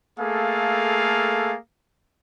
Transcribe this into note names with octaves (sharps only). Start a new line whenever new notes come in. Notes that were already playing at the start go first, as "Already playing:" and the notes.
A3 A#3 G#4 A4 F5